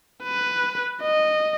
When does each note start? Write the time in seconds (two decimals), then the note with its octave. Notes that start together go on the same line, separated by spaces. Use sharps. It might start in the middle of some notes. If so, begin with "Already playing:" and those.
0.24 B4
1.02 D#5